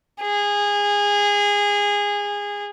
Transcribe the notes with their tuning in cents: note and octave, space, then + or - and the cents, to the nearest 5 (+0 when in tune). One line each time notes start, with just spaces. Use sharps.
G#4 -20